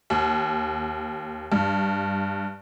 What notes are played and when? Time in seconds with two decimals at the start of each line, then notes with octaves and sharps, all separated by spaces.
0.10 D#2
1.52 G2